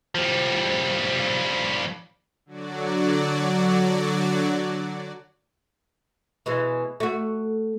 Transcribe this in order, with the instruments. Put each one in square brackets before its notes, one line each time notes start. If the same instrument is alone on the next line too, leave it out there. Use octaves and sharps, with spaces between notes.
[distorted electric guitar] F3 G3
[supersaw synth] D3 F#3 F#4 D5
[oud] B2 E3 G#3
A3 F#4